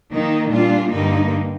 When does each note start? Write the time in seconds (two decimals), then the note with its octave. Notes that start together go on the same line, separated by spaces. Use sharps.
0.11 D#3 A#3 D#4
0.51 A#2 G3 D4 F4
0.92 G2 D3 G3 A#3 D#4